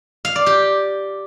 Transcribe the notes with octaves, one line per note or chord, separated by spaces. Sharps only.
F5
D5
G4